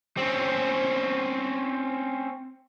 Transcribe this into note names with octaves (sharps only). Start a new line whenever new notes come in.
C4 C#4